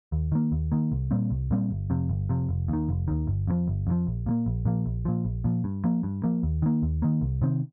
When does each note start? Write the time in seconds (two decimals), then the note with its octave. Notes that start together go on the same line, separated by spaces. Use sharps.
0.12 D#2
0.32 D#3 A#3
0.52 D#2
0.72 D#3 A#3
0.92 C2
1.11 A#2 G3 C4
1.31 C2
1.51 A#2 G3 C4
1.70 G1
1.90 F2 C3
2.09 G1
2.29 F2 C3
2.49 F1
2.68 D#2 D#3
2.89 F1
3.08 D#2 D#3
3.27 G1
3.47 F2 C3 F3
3.67 G1
3.87 F2 C3 F3
4.07 A#1
4.26 A#2 F3 A#3
4.46 A#1
4.65 A#2 F3 A#3
4.86 A#1
5.05 A#2 F3
5.25 A#1
5.44 A#2 F3
5.64 G2
5.84 F3 A#3
6.03 G2
6.24 F3 A#3
6.43 D#2
6.62 D#3 A#3
6.82 D#2
7.02 D#3 A#3
7.21 C2
7.41 C3 D#3 C4